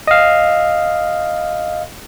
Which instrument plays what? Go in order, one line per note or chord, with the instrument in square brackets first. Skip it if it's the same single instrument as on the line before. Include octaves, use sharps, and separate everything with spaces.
[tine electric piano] D#5 F5